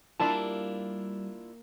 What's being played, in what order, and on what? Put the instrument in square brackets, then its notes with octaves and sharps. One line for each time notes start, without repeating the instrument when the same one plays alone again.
[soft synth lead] G3 [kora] A#3 [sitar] D4 E4 F4 [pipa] A5